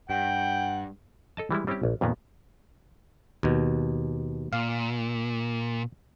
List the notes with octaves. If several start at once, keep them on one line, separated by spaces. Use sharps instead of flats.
G2 F#5 G5
A4 D#5 A5
E3 G3 G#3 E4
G3 C4 C#4 E4 G4
A#1
F2 A#2 D#3 A#3 B3
D#2 B2
A#2 F5